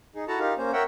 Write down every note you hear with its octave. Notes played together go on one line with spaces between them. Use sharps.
D#4 G#4
E4 F#4 A4 F#5 A5 A#5
D#4 F4 G4 A#4 F5
A#3 C#4 C5
A#4 C#5 E5 F#5 G5